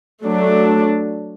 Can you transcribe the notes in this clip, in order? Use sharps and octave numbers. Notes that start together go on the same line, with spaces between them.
F#3 A3 D4